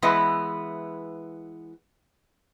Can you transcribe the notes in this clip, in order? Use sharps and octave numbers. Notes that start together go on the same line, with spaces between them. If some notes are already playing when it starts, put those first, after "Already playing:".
E3 G#3 B3 E4 B4